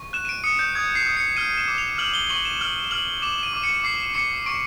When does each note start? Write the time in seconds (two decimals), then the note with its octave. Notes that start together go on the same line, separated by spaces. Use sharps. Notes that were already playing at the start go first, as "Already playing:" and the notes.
Already playing: C#6
0.13 F#6 E7
0.25 D#7
0.29 D7
0.44 D#6 C#7
0.59 G6
0.75 D#6 G#6
0.95 C7
1.06 D#6
1.17 C#7
1.37 F6 D#7
1.58 E7
1.68 D6
1.78 F7
1.98 F6 F#7
2.14 G7
2.30 C#6 F#7
2.45 E7
2.61 F6 F#7
2.91 F6 F#7
3.22 D6 E7
3.43 D#7
3.53 D6
3.63 C#7
3.84 D6 C7
4.14 D6 C#7
4.46 C#6 D7